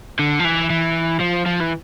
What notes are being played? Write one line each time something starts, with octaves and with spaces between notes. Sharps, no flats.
D3
F3
E3
E3
F3
F3
E3